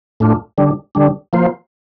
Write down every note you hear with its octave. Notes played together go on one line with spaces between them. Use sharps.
A2 A3 D4 F4
D3 G3 D4
D3 G3 D4
F3 A#3 F4 C5